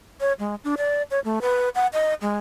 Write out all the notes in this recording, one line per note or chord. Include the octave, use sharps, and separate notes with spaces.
C#5
G#3
D4
D5
C#5
A3
B4
F#5
D#5
G#3